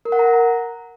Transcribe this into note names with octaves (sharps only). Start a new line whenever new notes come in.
A#4
F#5
A#5